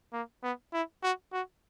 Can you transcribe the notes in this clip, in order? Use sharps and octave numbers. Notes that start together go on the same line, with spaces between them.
A#3
B3
E4
F#4
F#4